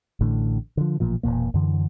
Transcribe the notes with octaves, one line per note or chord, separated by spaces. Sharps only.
A1 A2 D3
D3 F3
A1 A#2 F3
E1 E2 A#2 A#3
F#2 D3 E3